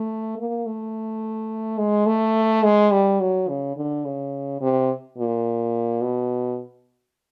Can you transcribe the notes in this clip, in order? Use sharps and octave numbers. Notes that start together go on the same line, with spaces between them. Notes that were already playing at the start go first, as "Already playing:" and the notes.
Already playing: A3
A#3
A3
G#3
A3
G#3
G3
F#3
C#3
D3
C#3
C3
A#2
B2